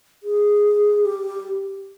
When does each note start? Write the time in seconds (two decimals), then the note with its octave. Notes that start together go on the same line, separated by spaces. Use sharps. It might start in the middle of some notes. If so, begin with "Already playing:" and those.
0.23 G#4
1.05 G4